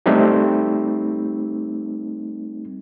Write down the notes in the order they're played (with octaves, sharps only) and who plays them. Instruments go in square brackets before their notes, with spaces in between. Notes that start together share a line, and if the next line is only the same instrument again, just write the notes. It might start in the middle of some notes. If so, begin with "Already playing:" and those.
[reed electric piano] G3 A3 C4 D#4 G4